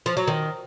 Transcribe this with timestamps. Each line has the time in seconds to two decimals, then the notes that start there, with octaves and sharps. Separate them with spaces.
0.06 F3
0.17 F#3
0.27 D#3